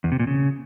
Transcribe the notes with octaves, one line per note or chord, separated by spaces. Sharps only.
E2
C3
A#2
C#3